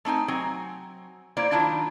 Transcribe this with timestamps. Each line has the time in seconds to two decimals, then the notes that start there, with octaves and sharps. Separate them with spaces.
0.05 A3 C4 D#4 G#5
0.28 F#3 C4 G#5
1.37 A#3 E4 C5 D5
1.51 D#3 F#3 D4 E4 F4